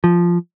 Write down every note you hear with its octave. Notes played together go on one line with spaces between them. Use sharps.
F3